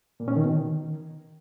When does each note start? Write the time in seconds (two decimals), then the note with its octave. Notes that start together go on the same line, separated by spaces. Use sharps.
0.20 A#2
0.28 C#4
0.36 D#3
0.44 B2
0.52 D#3